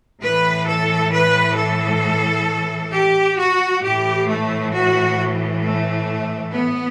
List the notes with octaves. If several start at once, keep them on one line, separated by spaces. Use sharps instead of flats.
A2 E3 B4
A4
B4
A4
G4
F#4
A2 E3 G4
A3
F#4
A3
B3